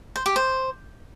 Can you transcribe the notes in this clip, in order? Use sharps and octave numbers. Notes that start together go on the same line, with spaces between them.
C5
G4
C5